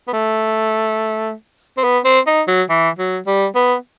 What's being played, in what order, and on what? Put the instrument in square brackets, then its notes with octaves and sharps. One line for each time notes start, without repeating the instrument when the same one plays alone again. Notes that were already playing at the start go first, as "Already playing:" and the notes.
[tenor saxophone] B3
A3
C4
B3
C4
D#4
F#3
E3
F#3
G3
B3